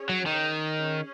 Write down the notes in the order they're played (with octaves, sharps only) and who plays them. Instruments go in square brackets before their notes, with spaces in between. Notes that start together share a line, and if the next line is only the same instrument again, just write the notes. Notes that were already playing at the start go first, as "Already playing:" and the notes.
Already playing: [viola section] C#4 G#4 C#5
[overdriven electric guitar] F#3
D#3
[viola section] C#4 G#4 C#5